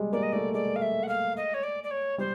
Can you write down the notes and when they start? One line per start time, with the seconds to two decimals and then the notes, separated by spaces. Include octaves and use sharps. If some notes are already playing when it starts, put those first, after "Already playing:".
Already playing: G3 G#3
0.12 A#3 D5
0.22 D#5
0.32 A3 D5
0.53 G#3 D5
0.75 F5
0.81 E5
1.03 F#5
1.08 F5
1.37 D#5
1.54 C#5
1.63 D5
1.83 D5
1.90 C#5
2.18 G3 C5